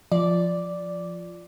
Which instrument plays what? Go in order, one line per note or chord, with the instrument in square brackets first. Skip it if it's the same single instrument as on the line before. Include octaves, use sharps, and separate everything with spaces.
[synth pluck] F3 D5